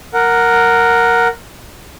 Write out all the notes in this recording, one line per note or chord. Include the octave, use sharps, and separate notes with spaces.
A#4 F#5